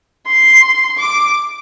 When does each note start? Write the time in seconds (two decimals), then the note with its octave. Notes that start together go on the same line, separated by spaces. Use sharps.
0.27 C6
0.98 D6